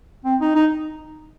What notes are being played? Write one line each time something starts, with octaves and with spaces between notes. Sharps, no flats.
C4
D#4
D#4